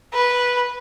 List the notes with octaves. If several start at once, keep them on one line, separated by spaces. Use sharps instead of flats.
B4